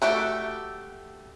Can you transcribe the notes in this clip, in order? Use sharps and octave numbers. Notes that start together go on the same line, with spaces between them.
A3 F#4 G4 E5